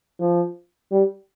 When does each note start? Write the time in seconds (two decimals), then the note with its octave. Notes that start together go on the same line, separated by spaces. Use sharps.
0.19 F3
0.91 G3